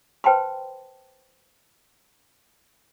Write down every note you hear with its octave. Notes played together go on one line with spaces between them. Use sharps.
B4 C5 G5 A5 B5 C6